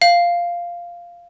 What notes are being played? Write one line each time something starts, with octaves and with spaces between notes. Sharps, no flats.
F5